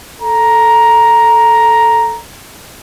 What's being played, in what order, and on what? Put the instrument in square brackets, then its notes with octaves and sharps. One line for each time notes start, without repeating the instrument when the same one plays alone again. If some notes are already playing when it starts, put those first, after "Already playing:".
[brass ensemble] A4 A#5